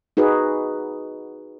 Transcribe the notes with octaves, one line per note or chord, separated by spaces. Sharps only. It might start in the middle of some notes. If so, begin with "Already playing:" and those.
D#4 F#4 G#4 B4